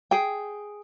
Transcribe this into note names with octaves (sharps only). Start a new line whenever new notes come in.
G#4 G5